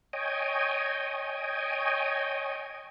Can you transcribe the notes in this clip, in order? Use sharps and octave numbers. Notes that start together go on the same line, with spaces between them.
C#5 D#5 G5 G#5